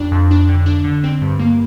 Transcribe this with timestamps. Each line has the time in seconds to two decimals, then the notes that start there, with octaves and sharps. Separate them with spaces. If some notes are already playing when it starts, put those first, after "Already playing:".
Already playing: F2 D4
0.12 F2
0.31 D4
0.49 D3
0.66 D4
0.84 D3
1.04 C4
1.21 G2
1.39 A#3